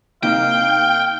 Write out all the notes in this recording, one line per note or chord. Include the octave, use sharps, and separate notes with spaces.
C3 A#3 D#4 F5 G5